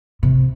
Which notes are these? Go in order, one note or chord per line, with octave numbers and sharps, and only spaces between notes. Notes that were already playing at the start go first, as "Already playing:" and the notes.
C3